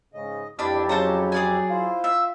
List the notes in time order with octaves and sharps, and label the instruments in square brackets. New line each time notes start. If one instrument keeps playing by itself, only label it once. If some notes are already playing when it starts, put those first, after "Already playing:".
[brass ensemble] G#2 C#3 [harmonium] D#5
[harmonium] F2 E4 G4 [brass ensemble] E3 F3 G3 [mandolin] D4 B5
[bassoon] C#3 [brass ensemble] F#3 [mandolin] A4 C5 A#5
[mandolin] G#4 D5 G#5
[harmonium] E4 C5 [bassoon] F4
[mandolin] E5